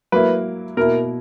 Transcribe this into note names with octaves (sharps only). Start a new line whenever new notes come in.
F#3 A#3 E4 B4
B2 A#3 E4 A#4